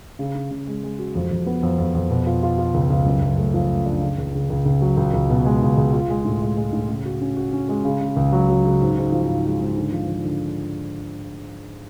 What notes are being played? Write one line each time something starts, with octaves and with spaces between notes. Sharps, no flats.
C#3
C#4
C#3
G#3
G#3
F#4
F2
F2
B3
F2
F2
F2
B2
F4
F4
F4
C#2
C#2
F#2
F#2
A3
F3
A3
D4
C#3
C#2
C#3
C#2
C#2
F#3
C#2
C#2
B2
G#3
C#2
C#2
F4
G#3
A2
G#3
G#3
A2
C#3
F#4
C#4
F#4
C#4
G#3
C#3
C#3
C#2
F#3
F#3
C#3
G#2
G#2
F3
G#2
G#3
G#2
D3
F3
F3
D3